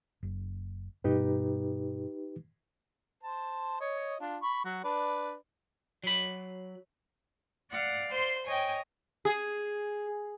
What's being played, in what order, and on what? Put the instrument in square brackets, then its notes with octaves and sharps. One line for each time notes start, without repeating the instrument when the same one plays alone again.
[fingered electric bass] F#1
[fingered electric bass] G2 B2 [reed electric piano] D#4 G4 B4
[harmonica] C5 A5
C#5 D#5
D4 F4
B5 C#6
F#3 F#4
D4 B4 D5
[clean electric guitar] F#3 B5
[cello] D5 F5 [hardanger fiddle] F#5
[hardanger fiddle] C5 C6
[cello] C#5 D#5 [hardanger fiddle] G5 G#5
[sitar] G#4